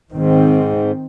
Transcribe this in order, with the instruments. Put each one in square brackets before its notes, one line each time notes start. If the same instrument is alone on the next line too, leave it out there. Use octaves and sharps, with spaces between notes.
[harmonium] G#2 [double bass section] D#3 C4